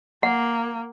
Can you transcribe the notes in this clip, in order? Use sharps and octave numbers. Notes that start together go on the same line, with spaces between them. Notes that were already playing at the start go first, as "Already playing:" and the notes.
A#3 F#5